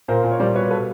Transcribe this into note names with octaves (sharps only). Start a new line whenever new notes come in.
A#2 A#4 C5
A#2
C#5
G3 C5 D5
B2 B4 C#5
A4 B4